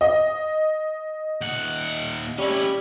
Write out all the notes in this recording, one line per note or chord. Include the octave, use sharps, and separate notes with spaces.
D#5
D#2 F#5
G3 C#4 E4